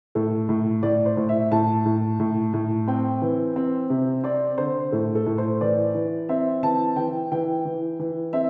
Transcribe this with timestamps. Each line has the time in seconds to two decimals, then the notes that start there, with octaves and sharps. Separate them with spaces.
0.15 A2 A4
0.49 A2
0.83 A2 D5
1.06 C5
1.17 A2
1.29 E5
1.52 A2 A5
1.85 A2
2.20 A2
2.53 A2
2.88 C4 G5
3.22 E3
3.56 C4
3.90 C3
4.24 C4 D5
4.58 D3 C5
4.92 A2 A4
5.15 A4
5.26 A2
5.38 C5
5.61 E3 D5
5.94 E3
6.29 C4 E5
6.63 E3 A5
6.96 E3 G5
7.32 E3 G5
7.65 E3
8.00 E3
8.33 C4 E5